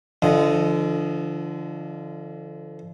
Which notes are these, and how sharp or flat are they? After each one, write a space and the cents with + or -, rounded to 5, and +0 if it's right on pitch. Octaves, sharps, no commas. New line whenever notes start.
D3 +0 F3 -35 D#5 +0